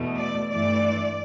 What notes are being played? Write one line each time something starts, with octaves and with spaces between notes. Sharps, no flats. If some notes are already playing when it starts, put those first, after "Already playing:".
Already playing: E2 B2 A3
D5
G2 E3 A3 D5